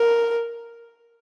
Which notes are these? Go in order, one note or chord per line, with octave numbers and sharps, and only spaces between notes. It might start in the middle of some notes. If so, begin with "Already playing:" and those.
Already playing: A#4